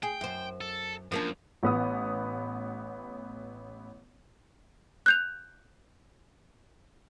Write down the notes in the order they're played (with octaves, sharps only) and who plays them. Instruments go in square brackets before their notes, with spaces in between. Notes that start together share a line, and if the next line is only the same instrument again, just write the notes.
[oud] G#4 [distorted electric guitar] G5
[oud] F#2 C5
[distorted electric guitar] A4
[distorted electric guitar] F#2 [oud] F3 A#3 D4
[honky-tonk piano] A1 B3 D#6
[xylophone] F#6 G6 F7